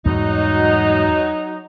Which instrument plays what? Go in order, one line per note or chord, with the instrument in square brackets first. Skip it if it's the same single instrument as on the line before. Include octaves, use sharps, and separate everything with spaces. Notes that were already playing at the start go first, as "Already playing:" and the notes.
[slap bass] E2 G#2 G3 [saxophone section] F#3 D#4